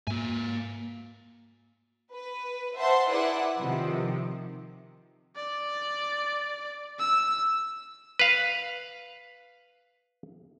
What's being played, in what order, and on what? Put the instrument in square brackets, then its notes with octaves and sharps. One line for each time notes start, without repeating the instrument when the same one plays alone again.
[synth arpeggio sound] G#2 [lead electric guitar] A#3 G#5
[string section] B4
C5 E5 F#5 A5 C6
E4 G#4 B4 D5 F#5
C3 D#3 F3
[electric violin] D5
E6
[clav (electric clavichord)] B4 F5